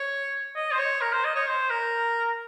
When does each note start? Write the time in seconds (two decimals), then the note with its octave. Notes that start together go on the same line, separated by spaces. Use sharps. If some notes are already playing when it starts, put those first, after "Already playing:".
Already playing: C#5
0.55 D#5
0.71 C5
0.78 C#5
1.01 A#4
1.12 C5
1.24 D#5
1.35 C#5
1.47 C5
1.70 A#4